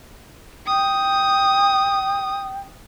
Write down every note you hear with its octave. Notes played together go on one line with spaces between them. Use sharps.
G5 D#6